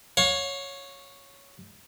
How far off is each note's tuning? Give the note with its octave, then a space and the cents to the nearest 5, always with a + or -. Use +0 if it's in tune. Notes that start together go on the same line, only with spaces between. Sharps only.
C#5 +0 F5 +40